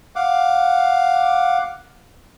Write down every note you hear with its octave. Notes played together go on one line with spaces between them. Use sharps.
F5 F#5 D6